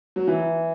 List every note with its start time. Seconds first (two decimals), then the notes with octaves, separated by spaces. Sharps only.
0.16 F#3
0.28 E3